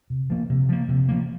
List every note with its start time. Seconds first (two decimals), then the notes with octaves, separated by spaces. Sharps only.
0.10 C3
0.30 F3 A#3
0.50 C3
0.69 F3 A#3
0.89 C3
1.09 F3 A#3